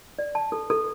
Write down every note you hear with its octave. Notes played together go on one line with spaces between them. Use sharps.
D5
A5
A4
A4